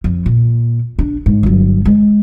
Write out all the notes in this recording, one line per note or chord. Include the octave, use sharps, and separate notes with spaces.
F2
A#2
D4
G#2
G1 F#3
G#3